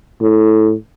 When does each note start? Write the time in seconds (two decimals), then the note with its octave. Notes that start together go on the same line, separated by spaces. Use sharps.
0.21 A2